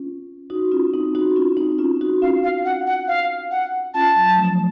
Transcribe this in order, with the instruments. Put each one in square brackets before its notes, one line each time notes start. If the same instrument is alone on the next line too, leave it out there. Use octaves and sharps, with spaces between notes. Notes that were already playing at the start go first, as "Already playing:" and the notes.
Already playing: [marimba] C#4 F4
D#4 F#4
C#4 F4
C4 D#4
D#4 F#4
C#4 F4
C4 D#4
C#4 F4
D#4 F#4
[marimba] C#4 F4 [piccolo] F5
[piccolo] F5
F#5
F#5
F5
F#5
[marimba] C#4 F4 [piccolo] A5
[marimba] F#3
F3 A3